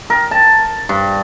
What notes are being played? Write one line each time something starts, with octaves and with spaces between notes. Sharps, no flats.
A#4
A5
G2